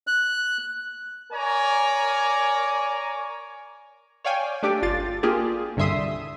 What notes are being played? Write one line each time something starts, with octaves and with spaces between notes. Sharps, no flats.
F#6
A#4 C#5 D5 G#5 A#5
C#5 D5 F5 G5 G#5
A3 D4 G4 D5
G1 F4 A6
A#3 D4 F4 G4 G#4
C2 G2 D3 E5 C6 D#6